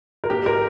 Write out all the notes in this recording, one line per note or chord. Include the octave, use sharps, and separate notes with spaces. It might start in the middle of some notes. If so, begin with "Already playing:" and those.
A#4
A#3 G4
A#4